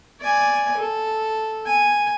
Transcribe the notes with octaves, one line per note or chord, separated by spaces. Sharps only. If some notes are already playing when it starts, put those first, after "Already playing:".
D5 G#5
A4
G#5